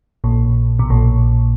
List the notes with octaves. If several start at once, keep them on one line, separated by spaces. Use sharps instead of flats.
A#1 A#2
B2
A#1 A#2